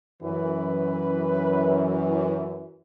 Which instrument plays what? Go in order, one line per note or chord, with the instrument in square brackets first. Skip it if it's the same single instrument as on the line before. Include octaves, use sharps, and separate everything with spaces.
[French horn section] F#2 E3 [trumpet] B4